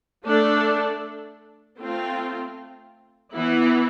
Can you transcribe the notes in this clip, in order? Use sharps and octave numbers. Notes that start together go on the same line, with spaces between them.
A3 D4 A4
A3 C4 F4
E3 B3 E4